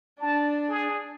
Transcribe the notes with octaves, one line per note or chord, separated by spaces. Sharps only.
D4 A5
G#4